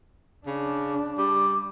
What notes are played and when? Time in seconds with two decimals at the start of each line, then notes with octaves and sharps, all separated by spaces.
0.47 C#3 D4
1.18 G3 D6